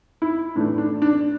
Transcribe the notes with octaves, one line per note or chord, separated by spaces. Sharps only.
E4
A2 E3 A3 D4
D4
D4